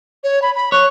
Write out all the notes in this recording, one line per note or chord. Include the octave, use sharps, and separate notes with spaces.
C#5
B5
B5
C#5 F#6